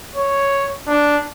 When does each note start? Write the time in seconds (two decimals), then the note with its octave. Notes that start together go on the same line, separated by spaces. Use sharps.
0.16 C#5
0.87 D4